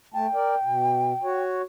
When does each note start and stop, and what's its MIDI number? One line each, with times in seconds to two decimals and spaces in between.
0.14 0.27 57
0.14 1.43 79
0.14 0.27 81
0.34 0.55 70
0.34 0.55 74
0.64 1.13 47
1.23 1.62 66
1.23 1.62 73